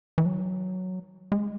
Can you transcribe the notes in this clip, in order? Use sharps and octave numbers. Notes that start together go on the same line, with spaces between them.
E3
F#3
G#3